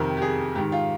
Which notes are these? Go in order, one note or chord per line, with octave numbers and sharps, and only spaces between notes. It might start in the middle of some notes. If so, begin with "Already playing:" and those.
Already playing: F2 C3 D#3 A#4
G4
G#4
G#2 D#3 G4
F4